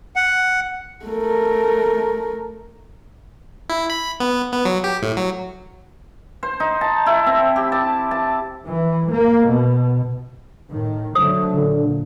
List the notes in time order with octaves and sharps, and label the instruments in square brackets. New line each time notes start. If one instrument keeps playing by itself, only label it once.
[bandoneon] F#5
[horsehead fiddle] A3 A#4
[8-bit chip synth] E4
B5
B3
B3
F#3
G4
A2
F#3
[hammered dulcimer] C5
D#4
A5
E4
C4
G4
A5
A5
[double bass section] E3
A#3
B2
A2 D#3
[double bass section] D3 F#3 A3 [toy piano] C5 D#6
[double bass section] A#2 [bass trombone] D3